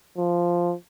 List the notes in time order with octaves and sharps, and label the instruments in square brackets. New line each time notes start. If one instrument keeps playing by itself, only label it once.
[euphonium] F3